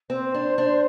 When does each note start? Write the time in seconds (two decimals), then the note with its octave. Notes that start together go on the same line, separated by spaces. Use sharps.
0.10 C4 C5
0.34 D4
0.58 D4